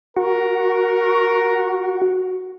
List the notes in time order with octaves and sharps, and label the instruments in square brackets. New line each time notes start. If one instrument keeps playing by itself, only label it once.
[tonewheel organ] F#4 [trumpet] A#4